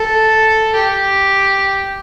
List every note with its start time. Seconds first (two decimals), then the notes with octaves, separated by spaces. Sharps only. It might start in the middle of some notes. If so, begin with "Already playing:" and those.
Already playing: A4
0.74 G4